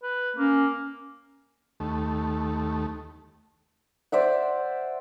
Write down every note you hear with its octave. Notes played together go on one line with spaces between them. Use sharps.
B4
A#3 C#4
D#2 A3
C5 D5 E5 F#5